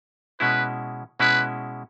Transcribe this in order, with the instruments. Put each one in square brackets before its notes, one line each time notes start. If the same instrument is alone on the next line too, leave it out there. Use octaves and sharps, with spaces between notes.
[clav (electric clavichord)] B2 G#3 C#4 E4 [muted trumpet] B4
[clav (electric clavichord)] B2 G#3 C#4 E4 [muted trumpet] B4